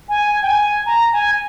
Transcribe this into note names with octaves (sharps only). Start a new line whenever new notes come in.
G#5
G5
G#5
A#5
G#5